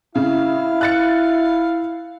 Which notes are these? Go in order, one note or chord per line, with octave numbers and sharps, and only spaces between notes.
C#3 E4 F5
F#6 A6 C#7